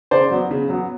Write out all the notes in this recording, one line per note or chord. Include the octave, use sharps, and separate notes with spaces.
C#3 C5 D5
F#3 B3
C#3
F#3 B3